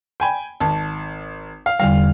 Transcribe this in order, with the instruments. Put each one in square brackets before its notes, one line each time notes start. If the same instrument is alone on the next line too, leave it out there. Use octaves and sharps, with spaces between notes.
[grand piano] G5 G#5 B5
[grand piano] G#1 [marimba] A5
[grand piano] F5
[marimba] E2 D3 G3 [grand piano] F5